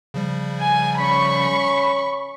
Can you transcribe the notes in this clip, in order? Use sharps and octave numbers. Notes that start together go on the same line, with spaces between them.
C#3 F3 G3
G#5
C#4 B5 C#6